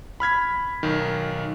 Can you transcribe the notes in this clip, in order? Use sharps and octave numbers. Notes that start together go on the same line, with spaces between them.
B5 F6 G#6 B6
B1 D#3